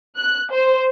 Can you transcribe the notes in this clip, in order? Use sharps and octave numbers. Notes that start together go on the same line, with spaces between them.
F#6
C5